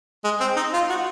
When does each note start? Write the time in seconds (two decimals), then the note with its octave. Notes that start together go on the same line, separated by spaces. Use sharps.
0.24 G#3
0.40 C4
0.56 D#4
0.74 F4
0.90 F#4